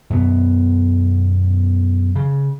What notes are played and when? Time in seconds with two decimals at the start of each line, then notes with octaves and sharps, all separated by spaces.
0.10 F#2 B2 B3
2.16 C#3